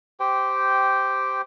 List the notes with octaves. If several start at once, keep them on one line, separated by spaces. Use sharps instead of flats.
G4 C5 G5